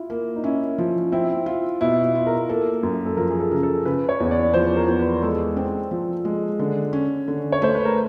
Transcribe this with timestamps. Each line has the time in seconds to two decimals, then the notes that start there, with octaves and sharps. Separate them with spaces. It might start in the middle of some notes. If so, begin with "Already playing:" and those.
Already playing: E4 F4
0.10 A#3
0.36 D#4
0.44 C#4 E4
0.78 F3
1.12 C4 E4
1.46 F4
1.81 B2 E4
2.15 F4
2.27 A#4
2.49 A#3 A4
2.83 F#2
3.06 A4
3.17 F3 A#4
3.31 G#4
3.40 A4
3.52 C#3
3.63 A4
3.85 C#3 B4
4.09 C#5
4.20 E2
4.31 D5
4.54 F3 C5
4.76 A#4
4.88 E2
5.00 B4
5.22 G#3 A4
5.57 C4
5.91 F3
6.25 G#3
6.59 D3
6.93 C#4
7.28 D3
7.52 C#5
7.62 A3 C5
7.75 B4
7.85 A#4